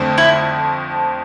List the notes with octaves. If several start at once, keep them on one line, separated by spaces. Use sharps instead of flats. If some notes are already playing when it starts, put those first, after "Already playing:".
Already playing: F2 D3 A3 C4
E4